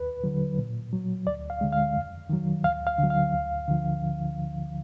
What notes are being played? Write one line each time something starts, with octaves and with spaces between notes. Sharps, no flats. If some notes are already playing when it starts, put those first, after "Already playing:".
Already playing: D#2 B4
D3 F#3
A#2
F#3
D2 D5
F5
D3 G#3
F5
F2
D#3 F#3
D2 F5
F5
D3 F#3
F5
D2
D3 F3